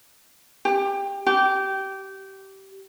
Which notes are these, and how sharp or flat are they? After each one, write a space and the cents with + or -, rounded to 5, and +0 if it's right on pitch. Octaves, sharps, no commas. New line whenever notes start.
G4 +20
G4 -20